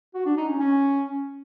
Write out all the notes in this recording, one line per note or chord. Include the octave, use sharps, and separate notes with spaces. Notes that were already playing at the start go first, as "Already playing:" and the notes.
F#4
D4
D#4
C#4
C#4